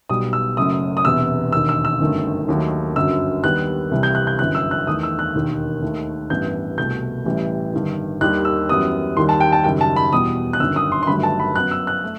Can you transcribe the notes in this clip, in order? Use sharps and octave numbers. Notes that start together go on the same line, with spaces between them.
B1 B2 G3 D#6
E6
F#1 F#2 F#3 A3 D#6
D#6
E1 E2 C3 E3 B3 E6
E1 D#2 D#3 E6
E6
E6
G1 F#2 D#3 A3
D#2 D#3 F#3 A3
G1 F#2 F#3 E6
D#2 D#3 G3 B3 F#6
C2 C3 E3 G3
G6
F#6
G6
G1 F#2 E3 F#6
E6
F#6
E2 D#3 A3 D#6
E6
F#6
E1 D#2 D#3
D#2 D#3 A3
A1 G2 E3 B3 G6
C2 B2 A3 G6
A1 A2 E3 G3
G1 G2 D#3
D#2 D#3 G3 F#6
E6
F#2 E3 G3 B3 D#6
D#2 D#3 G3 C6
A5
G5
A5
F#1 F#2 D#3 G3 G5
A5
B5
E2 B2 G3 B3 D#6
F#6
G1 F#2 D#3 E6
D#6
C6
C6
G1 G2 D#3 F#3 A3 B5
A5
B5
F#2 F#3 B3 F#6
E6
F#6
A3